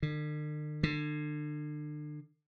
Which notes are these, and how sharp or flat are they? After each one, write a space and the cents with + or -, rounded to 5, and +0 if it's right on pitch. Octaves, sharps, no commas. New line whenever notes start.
D3 +45
D3 +35